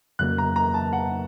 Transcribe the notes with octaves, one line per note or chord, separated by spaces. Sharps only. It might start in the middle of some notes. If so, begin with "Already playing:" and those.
F2 C#3 F#3 A#3 F#6
A#5
A#5
A5
F#5